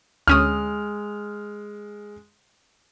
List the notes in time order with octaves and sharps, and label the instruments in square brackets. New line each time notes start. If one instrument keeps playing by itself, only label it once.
[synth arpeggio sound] D2 C#4 D#6 [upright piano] G#3 F6